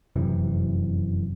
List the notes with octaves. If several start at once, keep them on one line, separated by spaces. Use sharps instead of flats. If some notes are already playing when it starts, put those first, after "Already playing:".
F1 F#2 C3 E3